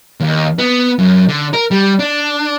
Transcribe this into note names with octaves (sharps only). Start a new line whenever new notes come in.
D#2
B3
F#2
D3
A#4
G3
D4